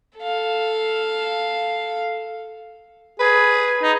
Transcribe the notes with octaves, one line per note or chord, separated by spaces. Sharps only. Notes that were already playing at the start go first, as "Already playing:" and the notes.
A4 F5
G#4 B4
D#4